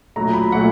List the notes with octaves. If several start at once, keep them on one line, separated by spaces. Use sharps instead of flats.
A#2 F#3 A3 A#5
B5
A#2 F#3 A3 F#5